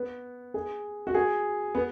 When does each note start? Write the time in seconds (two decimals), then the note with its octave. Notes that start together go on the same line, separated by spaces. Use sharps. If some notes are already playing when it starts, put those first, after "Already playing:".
Already playing: B3
0.54 G#4
1.07 F#4
1.15 G#4
1.75 B3